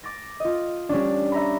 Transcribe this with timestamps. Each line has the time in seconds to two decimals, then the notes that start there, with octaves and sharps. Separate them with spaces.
0.03 D6 A6 A#6
0.40 F4 D#5
0.89 G3 C#4 D4
1.32 E5 A#5 B5